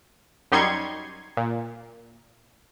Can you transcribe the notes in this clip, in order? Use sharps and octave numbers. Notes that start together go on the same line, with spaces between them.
F#2 G3 D#4 C6 C#6 G#6
A#2